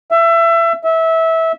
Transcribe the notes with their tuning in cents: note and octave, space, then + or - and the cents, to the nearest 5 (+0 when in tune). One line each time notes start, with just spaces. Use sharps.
E5 +25
E5 -20